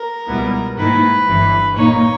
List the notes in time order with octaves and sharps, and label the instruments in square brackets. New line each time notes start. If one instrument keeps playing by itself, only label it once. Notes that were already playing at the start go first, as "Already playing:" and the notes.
Already playing: [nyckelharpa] A#4
[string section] C#2 B2 G3 B3 E4
[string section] G#2 D#3 A#3 E4 [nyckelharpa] B4
[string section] G1 G2 E3
[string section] A#2 A#3 D#4 [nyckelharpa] C#5